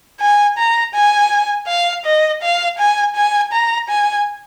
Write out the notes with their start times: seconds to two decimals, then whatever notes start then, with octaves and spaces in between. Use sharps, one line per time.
0.21 G#5
0.58 A#5
0.95 G#5
1.68 F5
2.05 D#5
2.42 F5
2.78 G#5
3.16 G#5
3.52 A#5
3.89 G#5